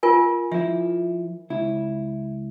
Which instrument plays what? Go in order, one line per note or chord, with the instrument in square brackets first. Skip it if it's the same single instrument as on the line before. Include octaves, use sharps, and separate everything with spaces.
[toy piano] F4 A#4 G#5
[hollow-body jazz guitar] F3 E4 [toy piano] E5
[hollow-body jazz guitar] C#2 E4